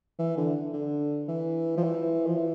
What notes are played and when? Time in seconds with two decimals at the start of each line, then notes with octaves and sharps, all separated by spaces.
0.19 E3
0.37 D3
0.74 D3
1.28 E3
1.77 F3
1.83 E3
2.27 F3
2.37 E3